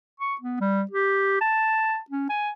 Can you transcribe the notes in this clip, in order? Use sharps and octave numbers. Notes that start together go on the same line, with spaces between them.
C#6
B3
G3
G4
A5
C#4
G#5